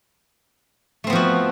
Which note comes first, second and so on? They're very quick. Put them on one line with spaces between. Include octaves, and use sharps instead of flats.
A3 C4 B3 F3 F#4